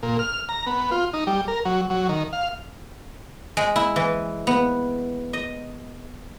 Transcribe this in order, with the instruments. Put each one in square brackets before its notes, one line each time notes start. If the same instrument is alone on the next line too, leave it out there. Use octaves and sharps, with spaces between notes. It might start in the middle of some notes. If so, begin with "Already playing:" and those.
[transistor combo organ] A#2
F6
A#5
B3
F4
D#4
G3
A#4
F#3
F#3
D#3
F5
[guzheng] G#3
E4
E3
B3
D#5